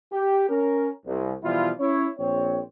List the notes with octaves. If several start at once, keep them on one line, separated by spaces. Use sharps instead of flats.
G4
C#4 A#4
C2
B2 E3 F3 G3 E4 F4
C#4 E4 C#5
A#1 C4 C#5